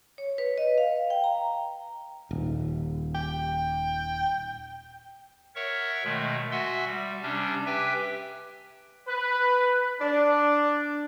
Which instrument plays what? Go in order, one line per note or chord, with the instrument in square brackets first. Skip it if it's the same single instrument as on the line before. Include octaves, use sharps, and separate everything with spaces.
[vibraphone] C#5
B4
D#5
F5
G5
A#5
[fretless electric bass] D#1
[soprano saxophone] G5
[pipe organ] A#4 C#5 E5 F#5 C#6
B2 D#3 G#3 A3
F#4 E5 F#5 G#5 C6 E6
G3
C3 G3 C#4 D4
G4 B4 E5 G5 G#5
[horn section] B4
D4